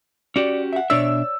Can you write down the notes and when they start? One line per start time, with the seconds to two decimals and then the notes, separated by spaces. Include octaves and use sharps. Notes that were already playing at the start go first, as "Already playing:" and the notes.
0.36 C#4 F#4 G4 D5
0.73 E5 F#5
0.90 B2 D4 C#5 D5 E5 E6